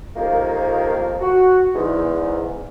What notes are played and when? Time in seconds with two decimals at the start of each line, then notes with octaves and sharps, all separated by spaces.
0.16 C2 F2 D#3 F3 A#3
1.20 F#4
1.74 E2 G#2